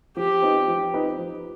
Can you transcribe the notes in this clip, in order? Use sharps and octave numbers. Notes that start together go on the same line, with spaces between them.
F3 G4
C4 D#4 B4 D#5
F3
C4 D#4 B4 D#5
F3